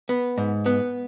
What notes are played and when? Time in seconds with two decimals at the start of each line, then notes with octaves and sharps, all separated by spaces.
0.09 B3
0.38 G#2
0.66 B3